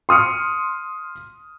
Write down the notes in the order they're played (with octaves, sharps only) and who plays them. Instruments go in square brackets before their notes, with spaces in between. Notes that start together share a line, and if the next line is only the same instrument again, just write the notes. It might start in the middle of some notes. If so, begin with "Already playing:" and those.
[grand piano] C6 D#6 F6 C#7